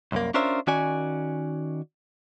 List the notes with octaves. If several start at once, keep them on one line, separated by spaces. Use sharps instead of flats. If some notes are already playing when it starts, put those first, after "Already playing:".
C2 F#2 A#3
C#4 D4 F4 A#4 C5 E5
D#3 C#4 F#4 D5 G#5